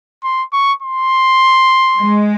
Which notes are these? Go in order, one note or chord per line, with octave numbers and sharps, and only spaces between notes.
C6
C#6
C6
G#3